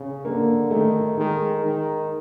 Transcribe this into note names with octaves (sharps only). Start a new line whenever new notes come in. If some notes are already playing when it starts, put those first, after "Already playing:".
Already playing: C#3
D3 A#3
D#3 A3
D#3 G#3
D#3